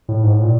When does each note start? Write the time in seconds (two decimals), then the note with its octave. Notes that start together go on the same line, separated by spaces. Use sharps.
0.09 A2
0.24 G#2
0.33 A2
0.43 A#2